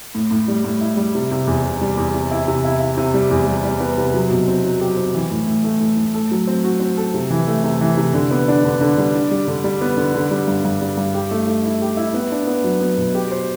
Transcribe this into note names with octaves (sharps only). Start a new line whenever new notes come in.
A2
A2
G3
A2
E4
G3
C3
C3
E2
C3
G3
E2
C3
E4
C3
E4
E4
C3
G3
E2
G3
G3
B3
C3
F#3
B2
C4
F#3
G4
C4
E3
A2
A2
A3
A2
A2
A4
F#3
C4
F#4
C4
A4
C3
E3
A3
C3
E3
C3
D3
B3
D4
D3
D3
G3
D4
G3
D3
G3
B3
D3
D3
G3
G2
G2
G3
G2
G4
A3
A3
E4
G4
E4
B3
D4
B3
F#3
B3
B2
G4
C5